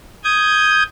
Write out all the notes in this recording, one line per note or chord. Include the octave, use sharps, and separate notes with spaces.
D#6 G6 G#6